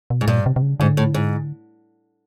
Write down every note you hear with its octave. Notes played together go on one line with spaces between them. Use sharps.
B2
G#2
G2 A#2
C3
C3
C#3
G#2 D3
A2
G#2